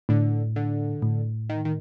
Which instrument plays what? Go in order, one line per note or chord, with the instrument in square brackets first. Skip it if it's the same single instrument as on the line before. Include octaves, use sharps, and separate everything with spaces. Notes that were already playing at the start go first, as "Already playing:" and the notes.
[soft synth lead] A2 [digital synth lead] D3
[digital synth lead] D3
[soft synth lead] A2
[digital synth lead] D#3
D#3